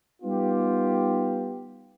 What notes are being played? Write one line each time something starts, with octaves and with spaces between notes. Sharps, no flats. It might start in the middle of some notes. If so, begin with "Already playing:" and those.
G3 B3 D#4 F4 G4